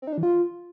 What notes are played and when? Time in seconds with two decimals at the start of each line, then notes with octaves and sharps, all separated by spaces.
0.02 C4
0.07 D#4
0.13 D4
0.18 E3
0.23 F4